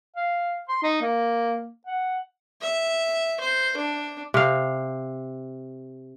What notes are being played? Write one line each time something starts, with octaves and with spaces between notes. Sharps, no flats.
F5
C6
D#4
A#3
F#5
E5
C5
D4
C3 F5